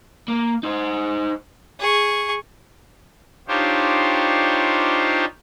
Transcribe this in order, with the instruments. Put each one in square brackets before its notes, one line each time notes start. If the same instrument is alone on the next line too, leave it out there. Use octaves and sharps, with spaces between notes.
[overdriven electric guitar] A#3
D#4 C5
[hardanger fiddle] G#4 C#6
[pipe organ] D4 D#4 F4 G4 C5 C#5